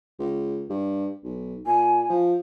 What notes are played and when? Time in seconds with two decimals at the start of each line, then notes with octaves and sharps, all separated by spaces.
0.19 C#2
0.69 G2
1.24 B1
1.66 A#2 G#5
2.09 F3